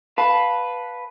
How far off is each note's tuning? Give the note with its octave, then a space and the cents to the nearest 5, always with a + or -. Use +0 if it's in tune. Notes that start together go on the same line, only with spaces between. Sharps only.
B4 +0 F5 +15 A5 +0